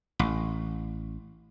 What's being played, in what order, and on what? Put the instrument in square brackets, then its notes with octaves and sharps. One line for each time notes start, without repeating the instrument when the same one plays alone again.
[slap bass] A1